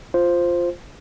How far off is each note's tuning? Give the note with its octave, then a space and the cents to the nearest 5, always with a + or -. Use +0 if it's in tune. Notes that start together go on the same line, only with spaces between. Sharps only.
F4 +0 C5 +0